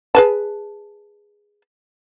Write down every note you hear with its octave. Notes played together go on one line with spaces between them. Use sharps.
G#4 B4 A5